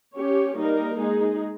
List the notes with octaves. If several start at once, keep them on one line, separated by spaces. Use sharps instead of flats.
C#4 G4 C#5
G3 A#3 D#4 A#4
G#3 D#4 G#4